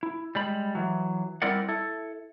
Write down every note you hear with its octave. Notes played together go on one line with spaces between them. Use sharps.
E4
G3 G#3 B5
E3 F#3
G3 C4 E4 A#4 D5 F#5
E4 A4